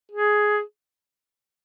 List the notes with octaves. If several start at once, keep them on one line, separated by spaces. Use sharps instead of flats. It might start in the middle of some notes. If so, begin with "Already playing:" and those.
G#4